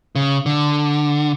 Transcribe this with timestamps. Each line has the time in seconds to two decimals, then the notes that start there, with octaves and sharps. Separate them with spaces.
0.15 C#3
0.46 D3